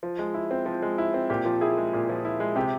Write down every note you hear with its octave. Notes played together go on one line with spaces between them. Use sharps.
F3
G#3
E4
C4
F3
G#3
E4
C4
A#2 G4
F3
E4 G#4
G#3
A#2
F3
E4
G#3
C3 G4